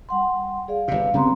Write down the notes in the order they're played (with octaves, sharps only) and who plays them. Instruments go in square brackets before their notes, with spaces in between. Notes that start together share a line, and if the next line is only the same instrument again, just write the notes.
[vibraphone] G3 F#5 C6
G#4 D5 F5
[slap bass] G1 C3 [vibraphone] F5
[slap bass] C#3 G3 B3 [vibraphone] C4 A#5 C6